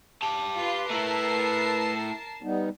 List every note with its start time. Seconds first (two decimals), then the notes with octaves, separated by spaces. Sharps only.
0.22 G4 A5
0.58 F4 B4 C6
0.90 A3 E4 A#4 A5 C7
2.43 G3 B3 D#4